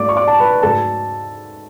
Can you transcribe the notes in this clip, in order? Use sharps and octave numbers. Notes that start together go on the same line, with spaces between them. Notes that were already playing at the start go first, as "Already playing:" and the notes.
Already playing: G#2 F#3 A3 D5 D6
C#6
D5 D6
A5
B4 B5
G#2 F#3 A3 A4 A5